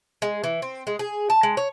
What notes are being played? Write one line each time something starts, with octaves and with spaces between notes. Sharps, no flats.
G#3
E3
C4
G#3
G#4
A5
G#3
C#5